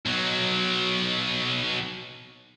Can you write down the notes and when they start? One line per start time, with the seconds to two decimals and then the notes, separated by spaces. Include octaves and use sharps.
0.06 B1 F#3